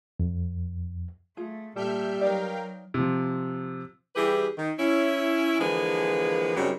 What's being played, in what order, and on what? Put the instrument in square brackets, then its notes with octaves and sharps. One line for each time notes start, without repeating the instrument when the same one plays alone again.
[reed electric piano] F2
[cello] A3 [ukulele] F4 G#4
[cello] A#2 [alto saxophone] G3 [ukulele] A4 [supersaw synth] E5 F6 G6
[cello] F#3 [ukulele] D#4 B4 D5 [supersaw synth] A#4 F5 G5
[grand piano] C3 F3
[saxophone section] E3 G3 E4 G4 G#4 B4
D#3
C#4 E4
D3 E3 F3 G#3 A#3 B4
F#2 C#3 F#3 G3 C4 D#4